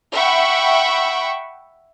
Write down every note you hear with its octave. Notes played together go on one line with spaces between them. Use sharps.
E5 F#5 G5 B5 C#6